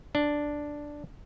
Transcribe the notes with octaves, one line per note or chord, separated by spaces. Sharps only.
D4